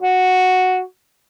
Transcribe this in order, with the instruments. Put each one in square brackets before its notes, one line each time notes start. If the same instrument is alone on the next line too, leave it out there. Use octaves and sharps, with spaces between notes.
[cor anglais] F#4